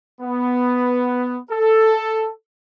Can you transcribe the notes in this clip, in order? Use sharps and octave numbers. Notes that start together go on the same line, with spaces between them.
B3
A4